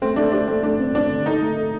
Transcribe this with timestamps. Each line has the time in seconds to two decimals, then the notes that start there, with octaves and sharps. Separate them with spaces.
0.02 A3 C4
0.16 A3 D4
0.32 D4 G4
0.47 A3 C4
0.63 A3 D4
0.79 C4
0.95 C4 D4
1.10 D3
1.26 D#4 A4
1.42 A3
1.57 A4